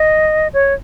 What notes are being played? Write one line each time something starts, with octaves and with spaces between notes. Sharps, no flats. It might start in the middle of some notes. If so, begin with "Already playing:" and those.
Already playing: D#5
C#5